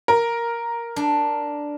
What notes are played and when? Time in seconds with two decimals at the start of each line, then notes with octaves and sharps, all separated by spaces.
0.08 A#4
0.96 D4